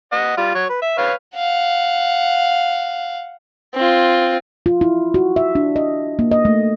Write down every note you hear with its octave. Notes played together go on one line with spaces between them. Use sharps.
D#5 F#5
G3 F4
F#3 C#5
B4
E5
B4 C#5 F5
F5 F#5
C4 F4
F4
E4
F#4
E5
D4
D#5
A#3
D#5
A3